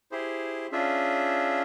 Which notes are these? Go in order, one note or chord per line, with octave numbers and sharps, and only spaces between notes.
E4 G4 G#4 C5
C#4 D4 F4 G#4 E5